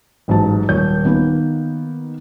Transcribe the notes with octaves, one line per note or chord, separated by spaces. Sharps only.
A1 G#2 F#3 A5
D#1 C#5 G6
D#3 A#3 B3